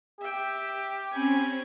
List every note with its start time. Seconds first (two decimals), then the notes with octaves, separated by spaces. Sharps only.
0.21 G4 E5 G5
1.11 C4 C#4 G#5 B5